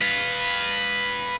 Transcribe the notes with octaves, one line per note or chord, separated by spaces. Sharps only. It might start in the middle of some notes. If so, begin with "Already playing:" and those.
B4 F5